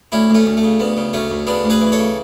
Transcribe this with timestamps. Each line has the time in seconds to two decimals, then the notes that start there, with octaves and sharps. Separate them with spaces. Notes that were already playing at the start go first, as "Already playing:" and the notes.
0.12 D2 C#4 E4
0.30 D2 A3 C#4
0.46 D2
0.57 A3
0.63 C#3
0.80 D2 B3
0.97 C#3
1.13 D2 A3 C#4
1.30 D2
1.47 C#3 B3 D4
1.64 D2
1.70 G#4 B4
1.81 E3
1.92 A4 C#5
1.98 C#3